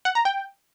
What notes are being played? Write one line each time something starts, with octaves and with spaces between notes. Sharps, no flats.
F#5
A#5
G5